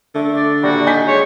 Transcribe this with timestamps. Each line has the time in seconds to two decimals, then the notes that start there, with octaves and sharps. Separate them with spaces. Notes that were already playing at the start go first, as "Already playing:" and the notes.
0.15 D3 A3
0.36 D5
0.63 D#1 G3 F#4
0.87 D#4 G#5 G6 B6
1.08 G#3 C#5